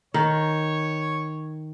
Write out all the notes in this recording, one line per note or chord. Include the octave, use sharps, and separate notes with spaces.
D#3 C#5